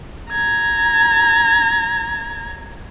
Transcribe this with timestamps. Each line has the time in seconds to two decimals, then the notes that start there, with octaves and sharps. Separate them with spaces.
0.31 A#5 G#6